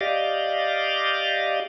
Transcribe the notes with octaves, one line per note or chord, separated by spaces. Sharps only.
G4 D5 D#5 F5